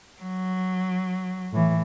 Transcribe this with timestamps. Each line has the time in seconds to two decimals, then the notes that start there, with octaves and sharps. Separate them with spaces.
0.20 F#3
1.52 A2 E3